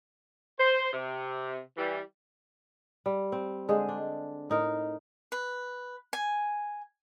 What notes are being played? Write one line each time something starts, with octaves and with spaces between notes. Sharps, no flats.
C5
C3
E3 G3
G3
C4
D3 G#3 G#4 C5
D4
A2 D#4 A#4
B4
G#5